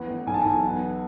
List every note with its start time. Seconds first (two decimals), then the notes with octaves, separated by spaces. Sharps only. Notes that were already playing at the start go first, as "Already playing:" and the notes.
Already playing: E2 B3
0.08 A1
0.27 B1 G#5
0.34 A5
0.42 B1 G#5
0.64 B3